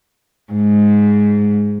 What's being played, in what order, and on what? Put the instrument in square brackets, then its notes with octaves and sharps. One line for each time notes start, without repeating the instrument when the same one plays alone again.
[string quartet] G#2